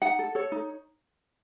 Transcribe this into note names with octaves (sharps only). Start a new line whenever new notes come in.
D#4 F#5
A4
A4 C#5
D#4